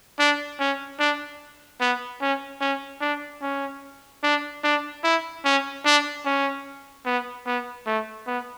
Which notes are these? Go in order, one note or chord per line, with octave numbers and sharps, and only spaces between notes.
D4
C#4
D4
B3
C#4
C#4
D4
C#4
D4
D4
E4
C#4
D4
C#4
B3
B3
A3
B3